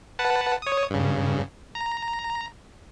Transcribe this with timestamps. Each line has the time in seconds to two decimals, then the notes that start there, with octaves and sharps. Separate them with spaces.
0.19 B4 F#5 A5
0.62 C#5 D#6
0.90 G2 C#3
1.75 A#5